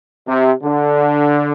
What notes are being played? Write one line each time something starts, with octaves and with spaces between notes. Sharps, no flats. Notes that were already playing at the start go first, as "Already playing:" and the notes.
C3
D3